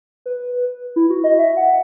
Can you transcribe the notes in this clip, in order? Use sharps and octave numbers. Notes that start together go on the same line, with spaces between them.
B4
E4
F#4
D#5
E5
F#5